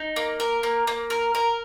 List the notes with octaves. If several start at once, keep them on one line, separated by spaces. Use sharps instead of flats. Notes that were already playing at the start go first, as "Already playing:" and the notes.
Already playing: D#4
A#3
A#4
A#3
A#3
A#4
A#4